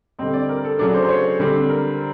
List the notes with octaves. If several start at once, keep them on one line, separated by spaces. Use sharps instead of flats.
D3 G3 C4 D#5
D5
A#4
A4
C#3 F#3 A3 D4
C5
C5
C#5
D3 G3 C4
A#4